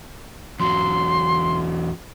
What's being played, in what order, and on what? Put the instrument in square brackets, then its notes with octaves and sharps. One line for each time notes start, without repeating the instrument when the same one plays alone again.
[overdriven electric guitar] E2 F#3 [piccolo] C6